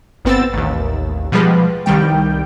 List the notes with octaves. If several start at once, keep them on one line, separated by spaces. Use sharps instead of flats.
G1 B3 C4 E6 A6
A1 D#2
B2 F3 G3 G#3 B4
C2 D#3 G3 G5